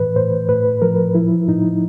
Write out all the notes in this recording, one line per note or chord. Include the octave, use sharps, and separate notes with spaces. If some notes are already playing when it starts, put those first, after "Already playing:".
Already playing: A2 E3 B4
A2 C5
A2 B4
F3 A#4
F3 E4
A2 D#4